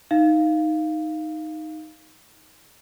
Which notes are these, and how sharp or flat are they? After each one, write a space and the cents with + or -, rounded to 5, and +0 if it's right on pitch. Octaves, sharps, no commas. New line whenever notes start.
D#4 +0 F5 -5